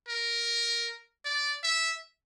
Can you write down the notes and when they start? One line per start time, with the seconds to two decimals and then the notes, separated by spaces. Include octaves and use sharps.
0.08 A#4
1.25 D5
1.63 E5